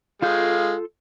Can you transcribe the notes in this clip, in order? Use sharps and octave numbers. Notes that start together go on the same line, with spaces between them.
G#3 F4 A4 F5 G6